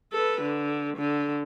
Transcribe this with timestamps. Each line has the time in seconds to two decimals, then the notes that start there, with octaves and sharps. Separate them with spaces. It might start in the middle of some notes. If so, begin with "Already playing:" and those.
0.13 A4 B4
0.42 D3
0.97 D3